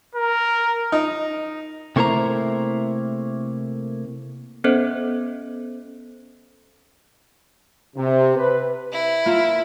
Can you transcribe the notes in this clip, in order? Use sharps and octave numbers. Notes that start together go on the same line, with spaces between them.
A#4
D#4
C3 A3 A#3 E4 C5 A#5
B3 C#4 A4 C5 D#5 F#6
C3
B4
E4
A#3 F4